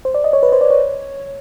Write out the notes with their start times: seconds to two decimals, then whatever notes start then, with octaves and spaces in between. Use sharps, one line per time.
0.05 C5
0.14 D5
0.24 D#5
0.33 C#5
0.43 B4
0.52 C5
0.61 D5
0.71 C#5